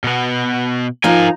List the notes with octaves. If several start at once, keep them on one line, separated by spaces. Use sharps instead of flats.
B2 B3
F3 D#4 A#4 G#5 A#5